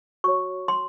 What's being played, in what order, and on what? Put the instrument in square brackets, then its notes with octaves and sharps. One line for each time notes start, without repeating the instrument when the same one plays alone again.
[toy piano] F#4 C#5 C#6
C6